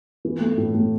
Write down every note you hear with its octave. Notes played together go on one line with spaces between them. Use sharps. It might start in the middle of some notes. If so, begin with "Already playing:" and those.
E3
A3
A2
A2